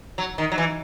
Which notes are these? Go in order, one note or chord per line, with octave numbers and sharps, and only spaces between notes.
F#3
D#3
F#3
E3